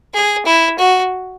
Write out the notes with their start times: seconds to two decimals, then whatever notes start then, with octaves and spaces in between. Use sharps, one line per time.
0.14 G#4
0.46 E4
0.78 F#4